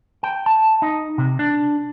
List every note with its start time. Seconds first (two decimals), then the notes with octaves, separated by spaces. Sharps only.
0.23 G5
0.46 A5
0.82 D#4
1.18 C3
1.39 D4